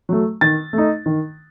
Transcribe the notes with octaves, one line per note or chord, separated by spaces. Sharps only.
F#3 A3
D#3 A6
A3
D#4
D#3